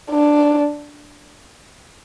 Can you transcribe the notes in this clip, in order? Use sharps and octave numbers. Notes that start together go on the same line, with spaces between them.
D4